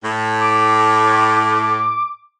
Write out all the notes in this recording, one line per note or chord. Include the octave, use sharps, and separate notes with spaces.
A2
D6